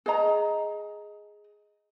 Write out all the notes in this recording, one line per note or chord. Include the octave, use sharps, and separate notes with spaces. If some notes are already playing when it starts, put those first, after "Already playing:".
G#4 D#5 A#5